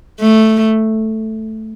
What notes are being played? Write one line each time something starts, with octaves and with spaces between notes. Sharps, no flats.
A3